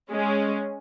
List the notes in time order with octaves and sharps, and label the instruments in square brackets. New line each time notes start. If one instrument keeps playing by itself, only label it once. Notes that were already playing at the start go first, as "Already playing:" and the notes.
[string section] G#3 C#4